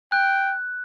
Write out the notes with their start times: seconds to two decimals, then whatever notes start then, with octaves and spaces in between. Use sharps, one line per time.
0.12 G5 F#6